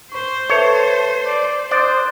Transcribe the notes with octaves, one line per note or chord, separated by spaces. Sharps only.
C5 C#6
A4 B4 C#5 E5 A5
D5
C5 D5 C6 D#6 F#6